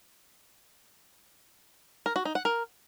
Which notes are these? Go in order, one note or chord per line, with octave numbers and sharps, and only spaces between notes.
A#4
F#4
D#4
F#5
A#4